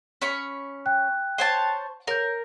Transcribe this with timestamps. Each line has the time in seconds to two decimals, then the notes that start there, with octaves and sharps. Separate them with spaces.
0.22 C#4 B5 C#6
0.86 G5 F#6
1.38 C5 C#5 A5
2.07 A#4 C#5 G6